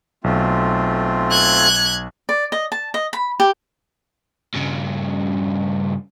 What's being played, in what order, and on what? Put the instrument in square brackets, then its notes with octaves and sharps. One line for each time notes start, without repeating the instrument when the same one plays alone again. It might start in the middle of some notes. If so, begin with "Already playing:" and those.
[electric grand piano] B1 [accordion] A3 C4 F4
[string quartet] F#6 G#6
[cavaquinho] D5
D#5
A5
D#5
B5
G4
[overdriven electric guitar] G2 C#3